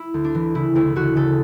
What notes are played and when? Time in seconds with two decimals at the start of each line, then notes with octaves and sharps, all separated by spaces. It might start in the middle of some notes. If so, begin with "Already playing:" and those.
Already playing: E4
0.14 D2
0.24 D4
0.35 E3
0.55 C#3 E4
0.75 D2 E4
0.96 D2 F#4
1.16 C#3 A4